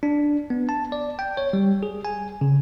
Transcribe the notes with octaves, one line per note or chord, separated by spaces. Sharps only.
D4
B3
A5
D5
G5
C#5
G3
G#4
G#5
C#3